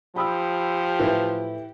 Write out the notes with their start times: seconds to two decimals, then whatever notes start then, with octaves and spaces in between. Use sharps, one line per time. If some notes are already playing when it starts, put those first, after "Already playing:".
0.16 F3 G4 B5 D#6 E6
1.00 A2 E3 E4 B4